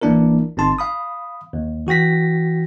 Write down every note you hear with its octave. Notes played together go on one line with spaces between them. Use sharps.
A1 E3 A#3 D4 E4 A#4
G1 C4 D#4 A5 C6
F5 B5 D#6
D#2
E3 F#4 G5 A#6 B6